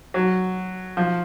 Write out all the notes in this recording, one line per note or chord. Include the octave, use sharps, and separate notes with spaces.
F#3
F3